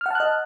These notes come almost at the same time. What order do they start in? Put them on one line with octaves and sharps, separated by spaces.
F6 F#5 A5 F#6 D#5